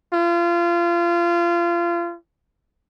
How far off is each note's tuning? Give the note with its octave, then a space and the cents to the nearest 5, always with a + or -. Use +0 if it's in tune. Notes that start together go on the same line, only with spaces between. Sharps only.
F4 -25